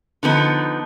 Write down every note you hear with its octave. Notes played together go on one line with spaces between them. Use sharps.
D3 F3 B3 D#4